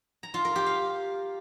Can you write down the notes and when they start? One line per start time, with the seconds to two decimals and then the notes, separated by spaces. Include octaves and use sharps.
0.23 A#5
0.34 F4
0.45 A#4
0.56 G4
0.66 F5